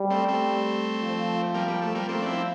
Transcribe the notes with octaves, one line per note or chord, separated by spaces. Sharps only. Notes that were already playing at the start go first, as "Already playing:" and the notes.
Already playing: G3
A3 C4
A3 C4
F3
G3 A#3
G3
A3
G3 A#3
F3 A3 C4
D4
C4 E4